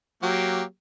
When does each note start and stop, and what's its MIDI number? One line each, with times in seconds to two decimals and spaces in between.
0.23 0.63 54
0.23 0.63 58
0.23 0.63 67